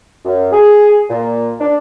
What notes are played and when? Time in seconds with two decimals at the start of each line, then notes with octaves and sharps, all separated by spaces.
0.25 F#2
0.53 G#4
1.10 A#2
1.60 D4